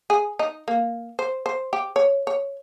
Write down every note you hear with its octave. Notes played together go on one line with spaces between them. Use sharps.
G#4
D#4
A#3
C5
C5
G4
C#5
C#5